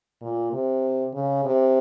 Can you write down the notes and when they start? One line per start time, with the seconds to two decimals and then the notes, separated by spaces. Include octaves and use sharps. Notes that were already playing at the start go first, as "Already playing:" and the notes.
0.22 A#2
0.53 C3
1.14 C#3
1.45 C3